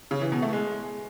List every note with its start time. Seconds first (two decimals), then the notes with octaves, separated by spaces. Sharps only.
0.11 C#3
0.21 E3
0.32 B2
0.42 A3
0.53 G#3